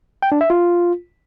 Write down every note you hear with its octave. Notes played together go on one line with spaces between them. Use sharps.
G5
D4
E5
F4